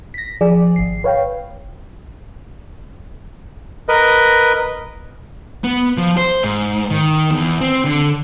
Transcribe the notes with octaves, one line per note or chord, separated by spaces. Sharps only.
A#6 B6
F3 G#4 D5
G#1 C7
B4 C#5 F5 G5
A#4 B4 D#5
B3
F3
C5
G#2
D#3
E2
C4
D3